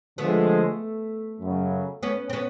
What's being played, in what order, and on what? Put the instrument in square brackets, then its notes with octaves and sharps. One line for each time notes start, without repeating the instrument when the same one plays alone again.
[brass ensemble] D3 F3 G#3 [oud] A3 B3
[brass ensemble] F#2 C#3 F#3
[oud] B3 C#4
C4
B3 C#4